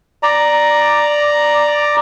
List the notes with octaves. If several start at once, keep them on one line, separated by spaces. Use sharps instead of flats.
D5 A#5